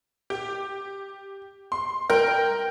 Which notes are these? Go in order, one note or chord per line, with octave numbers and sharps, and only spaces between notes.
G4
C6
A#4 G5